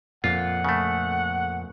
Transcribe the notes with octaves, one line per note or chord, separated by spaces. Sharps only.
F2 A#2 F4 F#5
C#3 A3